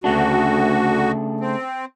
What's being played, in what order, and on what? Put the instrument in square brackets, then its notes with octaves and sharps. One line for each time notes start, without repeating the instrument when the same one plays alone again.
[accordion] D2 F#4 [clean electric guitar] C#3 A3 D4
[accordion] C4